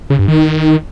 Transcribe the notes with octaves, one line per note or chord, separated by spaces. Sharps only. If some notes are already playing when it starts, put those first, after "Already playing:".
C#3
G2
D#3